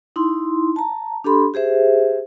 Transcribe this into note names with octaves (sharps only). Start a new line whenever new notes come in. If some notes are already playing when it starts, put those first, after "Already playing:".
D#4 E4 C6
A5 A#5
D4 G4 A4 B5 C6
G4 G#4 C5 E5